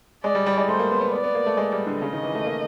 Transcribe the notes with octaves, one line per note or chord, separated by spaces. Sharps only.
G#3 D5
G3
G3
G#3
A3 C5
A#3
B3
B3
B3 D5
B3
A#3
A3
G#3
G3
D3
C#3 D#5
D#3
E3
A3
A#3